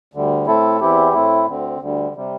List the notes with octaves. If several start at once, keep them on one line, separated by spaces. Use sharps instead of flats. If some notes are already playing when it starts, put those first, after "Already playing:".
D2 D3 G3
A2 A3 C4 E4 A4
E2 E3 C4 E4 G4
A2 A3 C4 E4
D2 D3 C4
D2 D3 G3
C3 G3